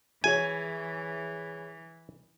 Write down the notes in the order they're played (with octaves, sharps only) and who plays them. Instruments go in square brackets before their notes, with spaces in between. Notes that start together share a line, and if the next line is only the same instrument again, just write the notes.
[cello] E3 [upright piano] E4 G#4 C#5 [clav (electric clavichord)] G#5